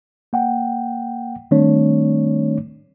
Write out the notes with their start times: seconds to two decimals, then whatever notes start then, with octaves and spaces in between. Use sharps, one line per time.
0.33 A#3 F#5 G5
1.51 D#3 G3 A3 C4 D4 C#5